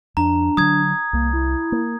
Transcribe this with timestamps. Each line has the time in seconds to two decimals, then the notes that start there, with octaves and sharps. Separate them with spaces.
0.17 F2 D4 A#5
0.57 D3 F#3 D#6 G#6
1.13 C2 A#3
1.33 E4
1.72 A#3